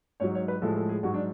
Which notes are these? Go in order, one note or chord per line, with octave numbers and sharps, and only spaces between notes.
G#2 F#3 C#5
C#5
B4
A2 F3 G#3 A4
A4
G#4
G#2 F#3 F#4
D4